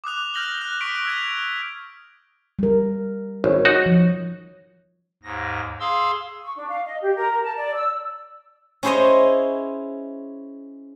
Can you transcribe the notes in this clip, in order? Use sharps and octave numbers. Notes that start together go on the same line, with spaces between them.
D6 D#6 F#6 F7
F6 G6 A#6 F#7 G7
F#6 A#6
C#6 B6 D7
E6 G#6 F7
G3 A#4
G#1 C#5
D#4 F#4
F3
D#2 G#2 A#6
G#4 F5 C6 E6
C#6
D4
F5
D#5
G4
A#4
A#4
A5
D5
E6
C#4 E4 G#4 C5 C#5 D#5